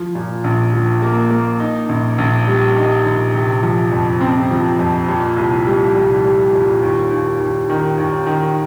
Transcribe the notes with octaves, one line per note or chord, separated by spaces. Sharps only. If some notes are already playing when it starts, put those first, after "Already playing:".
Already playing: F3
A#2
A#1
F3
A#3
A#3
D#4
A#1
A#1
G3
D#4
A#1
C3
F3
F2
C4
F3
F2
A#2
C2
G3
C2
G3
A#2
D#2
D#2
D#2
D#3
D#2
D#3